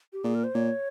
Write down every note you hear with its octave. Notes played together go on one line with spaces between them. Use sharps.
G4
A#2 G#4
A#4
C5
A#2 C#5